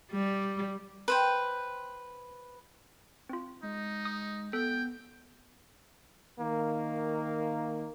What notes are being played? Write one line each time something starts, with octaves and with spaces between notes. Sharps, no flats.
G3
B4 C5 G5
C4 F4
G#3 D#4
D#6
B3 A4 G5
D#3 A#3